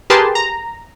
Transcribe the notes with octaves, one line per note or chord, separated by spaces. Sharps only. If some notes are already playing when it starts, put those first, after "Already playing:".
G4 G#4 A#4 B4 A5 C6
A#5